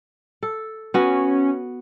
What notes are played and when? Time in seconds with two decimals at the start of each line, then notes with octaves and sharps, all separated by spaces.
0.43 A4
0.94 B3 C#4 F#4